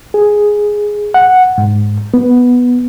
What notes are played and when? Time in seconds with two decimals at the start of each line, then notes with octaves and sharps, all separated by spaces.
0.14 G#4
1.14 F#5
1.58 G#2
2.14 B3